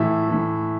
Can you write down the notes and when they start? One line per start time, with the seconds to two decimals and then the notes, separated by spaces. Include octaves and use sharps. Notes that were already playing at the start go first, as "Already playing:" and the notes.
Already playing: A2 E3 E5
0.28 A2 E3